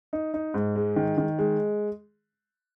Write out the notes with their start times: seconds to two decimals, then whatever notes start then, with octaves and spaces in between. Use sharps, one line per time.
0.13 D#4
0.34 D#4
0.54 G#2
0.76 G#3
0.96 D#3
1.18 D#3
1.39 G#3